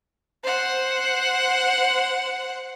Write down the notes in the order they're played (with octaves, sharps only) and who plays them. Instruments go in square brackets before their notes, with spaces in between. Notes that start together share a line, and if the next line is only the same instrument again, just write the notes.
[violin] C5 F#5